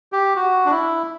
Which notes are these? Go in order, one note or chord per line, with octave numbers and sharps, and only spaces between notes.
G4
F#4
D4
E4